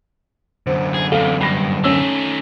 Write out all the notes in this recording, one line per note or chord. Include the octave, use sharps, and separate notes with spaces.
F#2 D3 C5
G#4
E2 C3 A4 F5
G2 B5 A#6
D#3 A3 C#4 E6